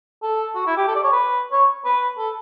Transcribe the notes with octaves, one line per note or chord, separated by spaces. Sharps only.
A4
F#4
E4
G4
A4
D5
C#5
B4
C#5
B4
A4